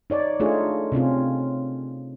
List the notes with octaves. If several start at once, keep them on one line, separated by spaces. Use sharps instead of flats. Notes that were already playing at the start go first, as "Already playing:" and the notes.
D#4 C#5 D5
A3 D4 D#4 F4 G#4 C#5
C3 C4 C#4 F4